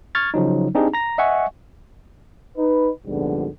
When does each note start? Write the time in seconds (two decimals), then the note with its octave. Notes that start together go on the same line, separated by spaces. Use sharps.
0.15 C#6 F6 G#6 A6
0.34 C#3 F3 F#3 D#4
0.75 C4 D4 D#4 G4 G#4
0.94 A#5 A#6
1.18 D#5 E5 F#5 G#5 C#6
2.57 D#4 B4
3.06 A#1 F2 G#2 D3 G3 B3